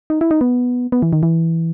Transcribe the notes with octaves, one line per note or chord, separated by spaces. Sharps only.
D#4
E4
D#4
B3
B3
E3
D#3
E3